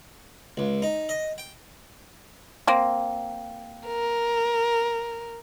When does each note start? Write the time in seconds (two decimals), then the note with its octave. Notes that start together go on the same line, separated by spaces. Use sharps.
0.57 C#2
0.82 D#4
1.09 D#5
1.38 G5
2.67 A#3 C4
3.87 A#4